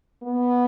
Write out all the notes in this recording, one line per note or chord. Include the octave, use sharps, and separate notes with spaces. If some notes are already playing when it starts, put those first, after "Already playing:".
B3